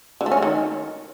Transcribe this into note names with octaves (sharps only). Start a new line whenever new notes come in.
D3
A3
C#4
G#3
D#3